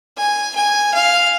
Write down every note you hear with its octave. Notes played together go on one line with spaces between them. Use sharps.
G#5
G#5
F5